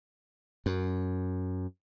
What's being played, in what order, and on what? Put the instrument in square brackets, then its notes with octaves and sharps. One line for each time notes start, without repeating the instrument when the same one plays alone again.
[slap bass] F#2